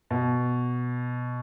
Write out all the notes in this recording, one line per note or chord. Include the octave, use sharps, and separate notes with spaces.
B2